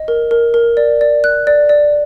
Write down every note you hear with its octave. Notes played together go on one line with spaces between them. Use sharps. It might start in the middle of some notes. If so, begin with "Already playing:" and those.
Already playing: D#5
A#4
A#4
A#4
D5
D5
F#6
D5
D5